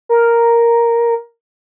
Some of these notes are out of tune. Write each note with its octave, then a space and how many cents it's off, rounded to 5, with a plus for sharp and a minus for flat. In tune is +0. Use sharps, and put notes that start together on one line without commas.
A#4 +0